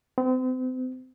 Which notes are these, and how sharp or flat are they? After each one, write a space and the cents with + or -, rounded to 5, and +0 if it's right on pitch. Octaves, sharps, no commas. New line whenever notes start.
C4 -35